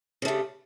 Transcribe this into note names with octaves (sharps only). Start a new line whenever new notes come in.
G2 C#3 A3